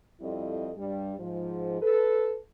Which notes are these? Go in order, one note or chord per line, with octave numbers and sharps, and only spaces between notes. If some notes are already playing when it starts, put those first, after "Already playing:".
F2 G3 C4 E4 A4 D#5
G2 G3
G#2 F3
A4 B4